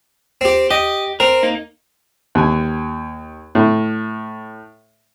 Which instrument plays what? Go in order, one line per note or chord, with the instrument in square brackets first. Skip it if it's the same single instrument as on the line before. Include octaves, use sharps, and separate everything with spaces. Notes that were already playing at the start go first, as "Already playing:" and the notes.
[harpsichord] C4 G4
[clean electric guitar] G4 [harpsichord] D#5
[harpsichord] C4 [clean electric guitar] A#4
[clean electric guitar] A#3 D#4
[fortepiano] D#2 G#5
A2